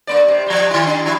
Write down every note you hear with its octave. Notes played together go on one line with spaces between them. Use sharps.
G2 A#3 D5
C3
F3 G3
D#3 E4
D4
F3 E4